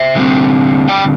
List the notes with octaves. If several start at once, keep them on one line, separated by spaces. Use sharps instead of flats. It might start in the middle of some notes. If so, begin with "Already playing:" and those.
Already playing: C5 E5
D3 G3 C4
D5 G5